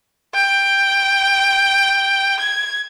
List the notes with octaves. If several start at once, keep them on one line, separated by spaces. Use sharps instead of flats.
G5
G#6